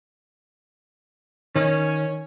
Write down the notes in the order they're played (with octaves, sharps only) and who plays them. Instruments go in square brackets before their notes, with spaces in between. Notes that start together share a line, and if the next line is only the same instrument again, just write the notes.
[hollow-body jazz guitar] D#3 [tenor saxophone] C#4